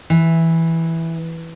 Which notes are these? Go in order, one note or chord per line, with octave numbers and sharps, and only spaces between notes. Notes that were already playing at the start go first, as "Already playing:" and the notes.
E3